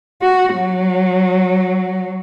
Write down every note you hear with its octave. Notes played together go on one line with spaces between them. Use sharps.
F#4
F#3